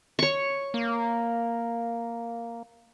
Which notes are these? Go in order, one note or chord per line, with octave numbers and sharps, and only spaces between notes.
C#5 C#6
A#3